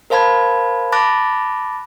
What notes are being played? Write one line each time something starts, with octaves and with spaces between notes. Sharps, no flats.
A#4 C5 F5 A5 B5 G#6
A5 B5 D6 F#6 A6 A#6